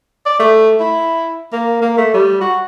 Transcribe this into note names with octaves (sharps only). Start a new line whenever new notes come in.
D5
A3
E4
A#3
A#3
A3
G3
F#4